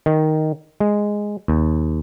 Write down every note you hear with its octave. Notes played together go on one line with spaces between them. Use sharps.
D#3
G#3
D#2